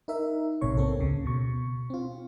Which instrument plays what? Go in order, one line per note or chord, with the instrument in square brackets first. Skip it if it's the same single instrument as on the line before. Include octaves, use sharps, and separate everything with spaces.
[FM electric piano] D#4 A#4 E5
A#1 G#2 C3 C#5 C#6
A#3 C4 A4
D2 C#3
B2 C#6
C4 F4